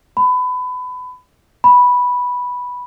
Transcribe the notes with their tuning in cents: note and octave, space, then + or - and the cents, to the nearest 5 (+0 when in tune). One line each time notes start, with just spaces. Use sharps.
B5 +25
B5 -5